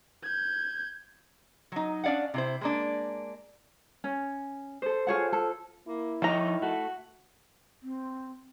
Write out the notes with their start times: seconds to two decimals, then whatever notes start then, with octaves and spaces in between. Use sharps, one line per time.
0.23 G6 G#6
1.72 F#3 D#4
2.04 C#4 D4 D5 F5 F#5
2.34 C3 E4 C5
2.61 G#3 A#3 D4
4.04 C#4
4.82 A4 C5
5.07 F4 G#4 C5 C#5 F#5
5.33 A4
5.88 A#3 E4
6.22 D#3 F3 D#4 C#5 G5 A#5
6.62 A3 F#4
7.83 C4